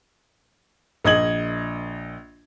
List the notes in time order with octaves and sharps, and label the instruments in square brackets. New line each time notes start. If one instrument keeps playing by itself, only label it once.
[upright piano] A#1 D#5 G#6 F#7